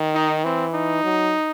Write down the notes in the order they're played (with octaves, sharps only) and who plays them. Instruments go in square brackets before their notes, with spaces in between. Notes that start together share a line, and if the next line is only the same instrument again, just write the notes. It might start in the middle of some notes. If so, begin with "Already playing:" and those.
Already playing: [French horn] D#3
[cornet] D#4
[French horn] E3 [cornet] C4
[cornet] D#4
[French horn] F#3